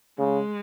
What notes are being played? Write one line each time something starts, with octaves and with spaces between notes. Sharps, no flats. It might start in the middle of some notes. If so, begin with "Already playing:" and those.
C#3 G#3